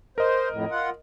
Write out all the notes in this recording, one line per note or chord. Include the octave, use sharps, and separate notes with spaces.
A#4 C5 D#5
F2 A2
F4 F#5